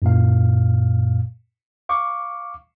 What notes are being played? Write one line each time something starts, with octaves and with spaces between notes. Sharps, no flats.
F#2 A#2 F5
F5 C#6 D6